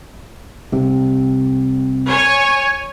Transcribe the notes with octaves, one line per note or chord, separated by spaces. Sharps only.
C2 C3
C#5 G#5